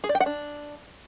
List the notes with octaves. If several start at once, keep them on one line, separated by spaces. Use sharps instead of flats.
G#4
D5
G5
F#5
D4